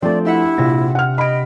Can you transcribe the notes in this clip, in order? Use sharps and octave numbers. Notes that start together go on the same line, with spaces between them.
F3 A3 C4 D4 D5
E4 G4 E5 F#5
A#1 C3 D5 A#6
F#5 F6
D#5 B5 D7